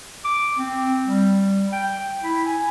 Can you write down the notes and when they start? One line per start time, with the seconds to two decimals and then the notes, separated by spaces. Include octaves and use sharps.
0.25 D6
0.56 C4
1.07 G3
1.72 G5
2.23 E4
2.46 G#5